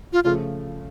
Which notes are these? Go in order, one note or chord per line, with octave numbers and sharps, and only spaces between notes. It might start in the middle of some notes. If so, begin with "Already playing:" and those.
F4
C#3 F3 A3 F4